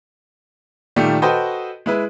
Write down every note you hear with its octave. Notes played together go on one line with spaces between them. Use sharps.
A#2 D#3 G3 A3
F#4 A4 B4 C5 D#5 G5
G#3 E4 B4